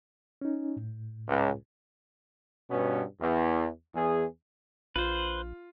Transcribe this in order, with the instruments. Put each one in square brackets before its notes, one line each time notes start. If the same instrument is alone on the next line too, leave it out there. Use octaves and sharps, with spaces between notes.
[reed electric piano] C#4 D#4
A2
[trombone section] C#2
G2 B2 B3 C#4
E2
E2 G#4
[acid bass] A#1 [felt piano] F4 [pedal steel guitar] B4 C5